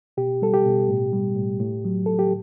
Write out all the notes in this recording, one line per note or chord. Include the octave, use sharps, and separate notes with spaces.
B2 G4
G3 A4
G4
B2
A2
G3
A2
A2
F#3
A2 A4
G4